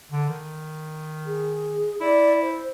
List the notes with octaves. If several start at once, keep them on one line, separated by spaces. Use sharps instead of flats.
D3
D#3
G#4
E4 D5
C5